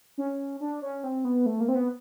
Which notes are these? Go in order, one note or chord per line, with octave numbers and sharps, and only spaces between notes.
C#4
D4
C#4
C4
B3
A3
A#3
C4
B3